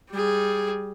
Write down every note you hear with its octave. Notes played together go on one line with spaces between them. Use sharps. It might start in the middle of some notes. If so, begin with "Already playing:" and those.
G3 G#4